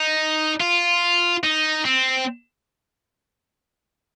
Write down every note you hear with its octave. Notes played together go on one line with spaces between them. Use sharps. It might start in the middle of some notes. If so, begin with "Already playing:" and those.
Already playing: D#4
F4
D#4
C4